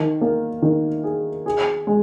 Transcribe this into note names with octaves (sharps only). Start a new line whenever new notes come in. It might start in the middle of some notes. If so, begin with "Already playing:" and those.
Already playing: D#3
A#3
D#3
G#4
G#4
G#3